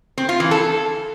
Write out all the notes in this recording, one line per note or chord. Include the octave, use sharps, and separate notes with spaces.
C4
F4
E3
A4